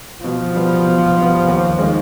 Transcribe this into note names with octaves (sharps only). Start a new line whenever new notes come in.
B2 F3
G3 B3
B2
G3 B3
D#2
D#3 G#3